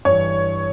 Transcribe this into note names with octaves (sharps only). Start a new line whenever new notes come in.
G2 E3 C#5